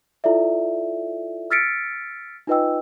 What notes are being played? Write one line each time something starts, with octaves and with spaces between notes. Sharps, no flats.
E4 F4 A4 D5 E5
E6 F6 A6 B6 C#7 D7
D#4 F4 B4 D#5 G5 E6